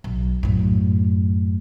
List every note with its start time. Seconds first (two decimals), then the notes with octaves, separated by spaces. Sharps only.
0.04 B1
0.43 F#2 A2